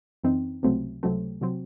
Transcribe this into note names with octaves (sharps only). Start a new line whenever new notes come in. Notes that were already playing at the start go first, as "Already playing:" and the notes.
F#2 E3 C4 D#4
C#2 C3 F#3 A3 C4
C#2 C3 F#3 A3 C4
C3 F#3 C4